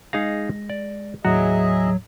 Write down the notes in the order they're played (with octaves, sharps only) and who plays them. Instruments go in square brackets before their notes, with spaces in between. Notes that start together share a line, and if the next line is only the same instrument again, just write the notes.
[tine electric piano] G#3 A#6 [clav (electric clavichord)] D#4 G#4 F5
[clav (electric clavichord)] D5
[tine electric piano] D#2 A2 A#5 [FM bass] F#3 [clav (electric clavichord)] F#4 [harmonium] G#4 D#5 E5